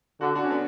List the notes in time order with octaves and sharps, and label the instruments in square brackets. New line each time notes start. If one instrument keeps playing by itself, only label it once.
[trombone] D3 [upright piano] F#4
[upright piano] D4 F#4
C#4
B3 D4